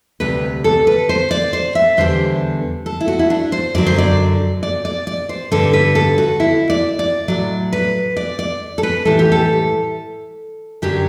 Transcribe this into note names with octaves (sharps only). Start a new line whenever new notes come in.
D2 C3 G3 B4
A4
B4
C5
D5
C5
E5
E2 D3 G3 C5
A4
E4
F#4
E4
D4
C5
F#2 D3 F#3 D5
C5
D5
D5
D5
D5
C5
G2 D3 G3 A4
B4
A4
F#4
E4
D5
D5
A2 F#3 D5
B4
D5
D5
A4
B4
A2 E3 G3 A4
G4
A4
F#2 D3 F#3 G4